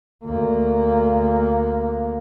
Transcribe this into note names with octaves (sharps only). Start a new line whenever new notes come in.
D2 A#3